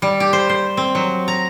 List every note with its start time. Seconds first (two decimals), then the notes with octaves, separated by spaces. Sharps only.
0.02 G3
0.20 G4
0.33 C5
0.49 C5
0.77 C4
0.95 F#3
1.28 A#5